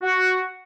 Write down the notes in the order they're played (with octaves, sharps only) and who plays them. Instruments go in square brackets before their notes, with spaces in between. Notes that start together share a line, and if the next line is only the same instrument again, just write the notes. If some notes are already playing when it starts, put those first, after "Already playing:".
[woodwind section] F#4